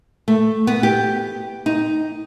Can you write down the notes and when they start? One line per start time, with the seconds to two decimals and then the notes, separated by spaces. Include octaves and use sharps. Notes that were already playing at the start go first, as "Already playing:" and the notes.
0.28 A3
0.67 B3
0.83 G4
1.66 D#4